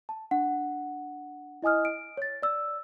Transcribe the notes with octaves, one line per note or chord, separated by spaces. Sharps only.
A5
D4 F#5
E4 D#5 G#5 D#6 F6
D7
C#5 A6
D5 E6